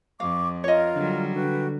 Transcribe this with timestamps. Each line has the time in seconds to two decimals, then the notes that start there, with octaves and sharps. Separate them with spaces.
0.20 F2 F5 C#6 D6
0.64 F4 A#4 C#5 D#5
0.95 D3 F#3 G3
1.35 D3 F#4 B4 G5